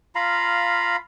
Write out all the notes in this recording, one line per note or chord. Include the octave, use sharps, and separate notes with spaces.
F4 F5 A#5 B5